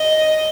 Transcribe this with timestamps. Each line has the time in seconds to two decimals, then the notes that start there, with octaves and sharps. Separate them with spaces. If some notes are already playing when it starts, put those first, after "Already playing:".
Already playing: D#5